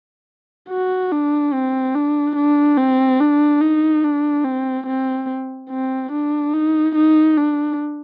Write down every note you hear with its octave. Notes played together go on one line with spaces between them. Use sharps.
F#4
D4
C4
D4
D4
C4
D4
D#4
D4
C4
C4
C4
D4
D#4
D#4
D4